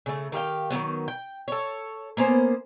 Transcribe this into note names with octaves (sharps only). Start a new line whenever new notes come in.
C#3 A3
D#3 G4 F5 G5
D#3 E3 F#3 B3
G5
A4 C#5
A#3 B3 C#4 C5